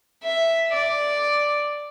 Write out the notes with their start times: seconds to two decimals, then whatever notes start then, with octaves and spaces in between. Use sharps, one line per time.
0.24 E5
0.73 D5